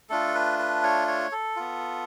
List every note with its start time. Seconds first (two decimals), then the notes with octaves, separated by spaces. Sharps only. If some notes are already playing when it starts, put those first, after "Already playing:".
0.10 A3 D4 F4 A4
0.35 B4
0.59 B4
0.84 C#5
1.08 C#5
1.32 A4
1.56 B3 F4